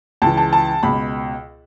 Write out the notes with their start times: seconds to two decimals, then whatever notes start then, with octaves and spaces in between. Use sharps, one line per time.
0.22 C#2 C#3 E3 A5
0.37 A5
0.53 A5
0.83 C#2 B2 B5